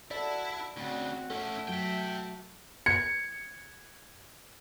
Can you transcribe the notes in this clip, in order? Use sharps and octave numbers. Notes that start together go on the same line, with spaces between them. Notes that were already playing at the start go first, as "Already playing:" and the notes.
E4 F#4 A4 D5
D2 C#3 C4 F#4
A3 C#4 E4 A4 F#5
F#3 F#4 E5 G5 D7
G#6 C#7